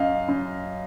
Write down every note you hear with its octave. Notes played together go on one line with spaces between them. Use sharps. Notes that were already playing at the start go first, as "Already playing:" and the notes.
Already playing: F#2 D#5 F5
F#2